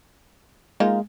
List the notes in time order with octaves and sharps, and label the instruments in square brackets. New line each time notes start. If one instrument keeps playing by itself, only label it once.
[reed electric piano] G#3 [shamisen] A#3 D#4 F4